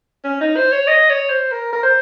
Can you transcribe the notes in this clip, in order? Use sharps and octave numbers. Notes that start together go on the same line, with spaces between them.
C#4
D#4
C5
C#5
D#5
C#5
C5
A#4
A#4
C5